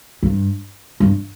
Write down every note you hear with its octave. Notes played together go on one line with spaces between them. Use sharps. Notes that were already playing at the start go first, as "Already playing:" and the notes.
G2
G2